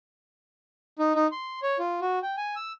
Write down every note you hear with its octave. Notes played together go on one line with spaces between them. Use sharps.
D#4
D#4
C6
C#5
F4
F#4
G5
G#5
E6